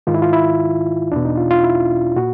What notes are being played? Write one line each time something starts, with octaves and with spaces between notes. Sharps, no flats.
G#2 D#3 F4
E4
F4
E4
E2 B2 D4
D#4
F4
F4
E4
A#2 F#4